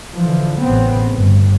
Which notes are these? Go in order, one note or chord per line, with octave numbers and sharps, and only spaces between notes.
D3 E3 F3
A1 C#3 B3 C4
G1 G2